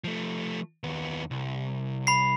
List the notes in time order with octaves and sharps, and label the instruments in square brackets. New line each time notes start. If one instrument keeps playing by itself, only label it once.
[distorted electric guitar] F3 A3
D#2 B3
C2
[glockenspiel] B5 C7